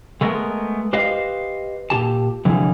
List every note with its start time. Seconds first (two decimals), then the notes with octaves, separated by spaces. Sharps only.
0.21 G#3 A3 B3 A#4
0.93 G4 B4 C5 D#5 F5
1.90 A#2 G4 A5
2.45 C2 D3 E3 F3 G3 G#4